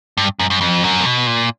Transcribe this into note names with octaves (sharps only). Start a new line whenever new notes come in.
G2
F#2
F#2
F2
F#2
C3
B2
A#2